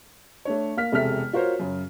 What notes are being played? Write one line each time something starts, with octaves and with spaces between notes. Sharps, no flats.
A3 D4 C#5
A#3 F5 F6 B6
E1 C3 A4 E5 F6 B6
F4 F#4 A#4 C5 C#5
F#2 C#3